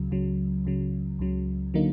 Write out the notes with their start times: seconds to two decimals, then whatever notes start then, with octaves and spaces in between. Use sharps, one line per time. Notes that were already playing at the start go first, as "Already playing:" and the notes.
Already playing: C#2 C#3 F#3
0.11 C#2 C#3 F#3
0.65 C#2 C#3 F#3
1.19 C#2 C#3 F#3
1.74 D3 F#3 A#3 D#4